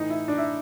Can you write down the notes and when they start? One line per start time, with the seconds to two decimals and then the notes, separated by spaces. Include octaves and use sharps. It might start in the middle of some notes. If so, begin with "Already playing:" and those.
Already playing: A2 E3 D#4
0.10 E4
0.28 D4
0.38 E4